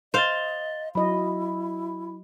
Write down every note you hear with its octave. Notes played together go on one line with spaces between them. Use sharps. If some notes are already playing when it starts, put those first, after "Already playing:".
C5 D#5 F5 A6 G7
F#3 E4 D#5 B5